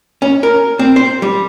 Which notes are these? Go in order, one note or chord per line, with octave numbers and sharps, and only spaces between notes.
C#4
A#4
C4
C5
G3